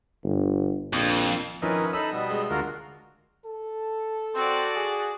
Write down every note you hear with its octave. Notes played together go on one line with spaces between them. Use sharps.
G1
A#1 F2
D#3 F3 C#4 E4 A#4 B4 D#5
D#4 A4 D#5 E5 B5 E6
B2 G3 B3
G#3
D2 F4 F#4 A#4
A4
C4 F#4 D5
G#4